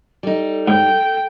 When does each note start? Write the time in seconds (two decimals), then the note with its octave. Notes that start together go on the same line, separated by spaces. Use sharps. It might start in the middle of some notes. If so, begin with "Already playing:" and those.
0.23 G3 D#4 A4
0.68 G#2 G5